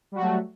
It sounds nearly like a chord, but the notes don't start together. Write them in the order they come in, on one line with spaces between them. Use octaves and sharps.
G3 F#4 F#3 A3